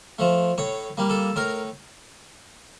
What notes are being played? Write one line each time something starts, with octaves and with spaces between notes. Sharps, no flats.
F3 A3
A2 C#5
G3 A#3
A4
A2 A#4